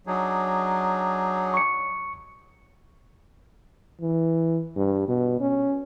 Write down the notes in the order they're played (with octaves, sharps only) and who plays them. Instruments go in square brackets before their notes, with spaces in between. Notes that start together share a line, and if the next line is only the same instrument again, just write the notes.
[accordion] F#3 [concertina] D4 D#4 G#4
[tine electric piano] C#6 C#7
[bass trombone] E3
G2
B2
C#4